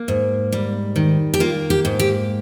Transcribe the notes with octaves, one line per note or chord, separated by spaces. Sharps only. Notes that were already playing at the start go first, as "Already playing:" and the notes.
Already playing: A#3
G#2
G3
D#3
G4
A#3 F4
G4
G#2
G4